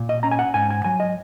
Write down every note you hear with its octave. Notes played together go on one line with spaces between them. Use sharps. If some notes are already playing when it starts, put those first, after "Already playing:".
Already playing: A#2
D#5
C#4 A#5
G#5
F#5
G#2 G#5
G#5
F#3 G#5
D#5